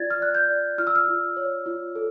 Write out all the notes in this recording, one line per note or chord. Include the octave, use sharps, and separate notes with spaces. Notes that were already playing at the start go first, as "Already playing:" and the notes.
Already playing: F4 D5 G#6 A6
F6
D5 F#6
G6
D5
F4 F6
E6
F6
F4
C#5
F4
A4